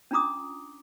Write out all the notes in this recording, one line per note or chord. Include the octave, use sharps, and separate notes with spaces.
C#4 D4 F4 A#5 D6 D#6